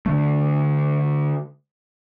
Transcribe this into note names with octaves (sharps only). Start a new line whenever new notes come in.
D3 A3